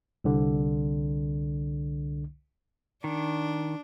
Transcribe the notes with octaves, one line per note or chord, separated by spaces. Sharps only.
C2 D3
D#3 D4